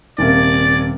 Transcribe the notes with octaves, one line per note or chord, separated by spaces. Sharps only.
D#1 C3 A#3 D5